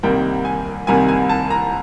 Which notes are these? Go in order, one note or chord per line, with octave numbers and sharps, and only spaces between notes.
C2 C3 D#3 G3 A#3 G5
G#5
C2 C3 D#3 G3 A#3 G#5
G#5
A5
A#5